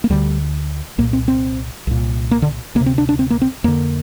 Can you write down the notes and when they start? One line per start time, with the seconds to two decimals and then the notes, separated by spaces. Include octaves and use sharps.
0.04 A#3
0.10 D2 D3 G3
0.98 C2 A#2 A#3
1.13 C4
1.28 C4
1.87 C2 A#2
2.31 A#3
2.42 D3
2.75 D2 A#3
2.80 C3
2.86 C4
2.98 D4
3.09 D4
3.19 C4
3.30 A#3
3.42 C4
3.64 F2 D3 A#3